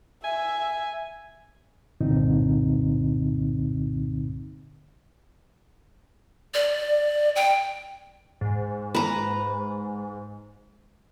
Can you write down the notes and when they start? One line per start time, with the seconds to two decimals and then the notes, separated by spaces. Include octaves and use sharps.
0.24 E5 G#5
2.01 C2 G2 A#2 D3 C4 D#4
6.54 D5
7.36 G5
8.41 G#2
8.95 B4 A#5